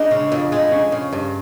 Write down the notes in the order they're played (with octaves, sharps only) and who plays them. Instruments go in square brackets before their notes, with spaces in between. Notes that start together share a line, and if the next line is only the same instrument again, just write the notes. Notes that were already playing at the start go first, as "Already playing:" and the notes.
Already playing: [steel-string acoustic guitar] G#3 [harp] D4
[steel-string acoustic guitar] C#3
F2
G#3
[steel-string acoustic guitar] F2 [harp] C#4
[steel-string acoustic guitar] C#3
G2